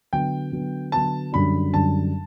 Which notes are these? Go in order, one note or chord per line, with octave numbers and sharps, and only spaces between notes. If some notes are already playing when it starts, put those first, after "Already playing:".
D3 F#3 B3 G5
D3 F#3 B3
D3 F#3 B3 A5
F#2 D3 G3 D4 B5
F#2 D3 G3 D4 A5